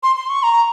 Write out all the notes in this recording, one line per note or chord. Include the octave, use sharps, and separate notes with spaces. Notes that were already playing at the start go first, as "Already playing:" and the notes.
C6
C6
C#6
A#5